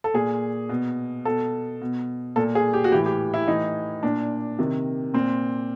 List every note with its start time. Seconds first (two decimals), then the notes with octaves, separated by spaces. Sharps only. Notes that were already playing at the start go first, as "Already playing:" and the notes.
0.04 A4
0.14 A#2 G#4
0.69 B2
1.25 B2 A4
1.81 B2
2.36 A#2 A4
2.55 G#4
2.73 G4
2.84 F#4
2.92 A2 E3 G4
3.06 G4
3.34 E4
3.47 A2 E3 D#4
4.03 A#2 D4
4.59 C3 D#3
5.14 A#2 C4